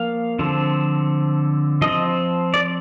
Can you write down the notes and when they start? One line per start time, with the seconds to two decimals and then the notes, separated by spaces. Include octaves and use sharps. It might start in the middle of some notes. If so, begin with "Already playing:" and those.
Already playing: F3 A#3 F5
0.39 D3 F3 C4
1.82 F3 C4 D#5
2.54 D5